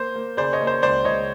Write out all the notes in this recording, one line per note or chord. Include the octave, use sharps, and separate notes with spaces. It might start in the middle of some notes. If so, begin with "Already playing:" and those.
Already playing: A#3 C5
A#3
C#3 C5 D5
C#5 D#5
A#3
C5
C#2 C5 D5
C#2 C#5 D#5